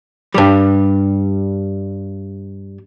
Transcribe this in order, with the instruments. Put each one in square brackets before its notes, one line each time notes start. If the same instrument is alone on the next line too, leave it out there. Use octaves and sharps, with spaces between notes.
[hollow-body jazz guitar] G2 G3